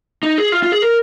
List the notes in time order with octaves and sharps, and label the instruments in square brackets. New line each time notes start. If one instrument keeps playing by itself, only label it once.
[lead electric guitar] D#4
G#4
F4
F4
G#4
A#4